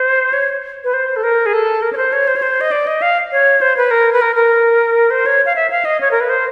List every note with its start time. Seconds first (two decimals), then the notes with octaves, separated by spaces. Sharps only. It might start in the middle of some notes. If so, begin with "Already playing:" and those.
Already playing: C5
0.33 C#5
0.84 B4
0.93 C5
1.16 A4
1.23 A#4
1.46 G#4
1.53 A4
1.82 A#4
1.93 C#5
1.97 C5
2.12 C#5
2.27 C5
2.36 C#5
2.42 C5
2.61 D#5
2.71 D5
2.87 D#5
3.02 F5
3.32 C#5
3.61 C5
3.77 B4
3.91 A#4
4.13 B4
4.21 A#4
4.35 A#4
5.10 C5
5.26 C#5
5.46 F5
5.55 E5
5.70 F5
5.85 D#5
6.00 C#5
6.11 A#4
6.20 B4
6.29 C5